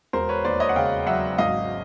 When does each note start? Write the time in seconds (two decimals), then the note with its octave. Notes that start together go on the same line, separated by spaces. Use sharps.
0.13 E1 A#4 C5
0.29 B4 C#5
0.44 D#2 C5 D5
0.60 C#5 D#5
0.69 F#5
0.76 C#3 F5 G5
1.07 F#3 E5 F#5
1.38 G#1 D#5 F5